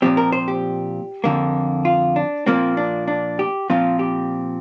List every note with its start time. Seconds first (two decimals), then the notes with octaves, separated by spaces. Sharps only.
0.02 A#2 F3 C4 G4
0.17 A#4
0.32 C5
0.48 G4
1.24 F2 D3 A#3
1.85 F4
2.16 D4
2.46 A#2 F3 A#3 C4
2.77 D4
3.08 D4
3.39 G4
3.70 A#2 F3 C4 F4
3.99 G4